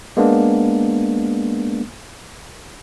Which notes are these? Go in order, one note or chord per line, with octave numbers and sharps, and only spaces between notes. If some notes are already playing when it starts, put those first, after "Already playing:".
G#3 A#3 B3 D4